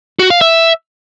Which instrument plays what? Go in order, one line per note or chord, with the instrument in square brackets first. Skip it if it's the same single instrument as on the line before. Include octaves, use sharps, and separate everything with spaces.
[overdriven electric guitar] F#4
F5
E5